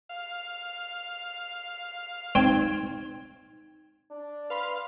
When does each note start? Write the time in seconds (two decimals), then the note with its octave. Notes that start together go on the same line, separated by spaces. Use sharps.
0.09 F5
2.35 C4 D#4 G#6
4.11 D4
4.50 B4 F5 B5 C6